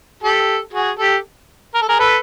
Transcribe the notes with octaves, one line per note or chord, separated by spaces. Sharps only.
G4 A4
F#4 G#4
G4 A4
A#4
A4
G#4 A#4
A4 B4